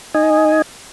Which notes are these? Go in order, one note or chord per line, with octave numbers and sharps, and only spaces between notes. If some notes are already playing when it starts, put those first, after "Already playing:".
D#4 D#5 G#5